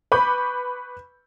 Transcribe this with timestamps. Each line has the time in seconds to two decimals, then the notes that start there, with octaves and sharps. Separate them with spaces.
0.12 B4 B5 C#6 D6 G6